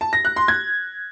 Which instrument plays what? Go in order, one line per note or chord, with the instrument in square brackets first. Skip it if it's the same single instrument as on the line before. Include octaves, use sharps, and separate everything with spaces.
[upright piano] A5
A#6
F#6
C6
G#6